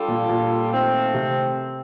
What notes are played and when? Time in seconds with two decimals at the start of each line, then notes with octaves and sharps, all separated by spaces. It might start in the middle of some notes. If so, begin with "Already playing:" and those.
Already playing: G3 D4 F4 A4
0.08 A#2
0.29 A#2
0.72 D#3 A3 C4
1.14 C3